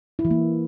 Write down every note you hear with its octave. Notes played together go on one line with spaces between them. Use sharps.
E4
E3
A#3